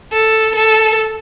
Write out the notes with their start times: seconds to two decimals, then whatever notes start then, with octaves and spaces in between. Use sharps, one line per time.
0.12 A4
0.55 A4